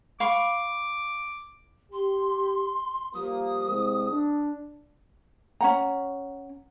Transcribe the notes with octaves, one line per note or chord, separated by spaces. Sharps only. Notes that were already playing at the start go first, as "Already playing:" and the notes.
F5 B5 C#6 D6
G4 C6
F3 G3 A#3 D#6
C2 G#3 C4
D4
C#4 F#5 A#5